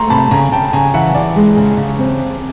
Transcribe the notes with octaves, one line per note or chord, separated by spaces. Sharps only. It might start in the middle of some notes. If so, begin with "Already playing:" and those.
Already playing: A3 A#5 C6
C3 A5 B5
C#3 G#5 A#5
C#3 G5 A5
C#3 G#5 A#5
E3 E5 F#5
E3 D5
G#3
C#3
C#3
C4